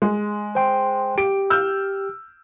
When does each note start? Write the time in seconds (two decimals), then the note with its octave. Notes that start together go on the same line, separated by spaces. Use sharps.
0.02 G#3
0.55 C5 G5 C6
1.18 G4 D7
1.50 E6 F6 G6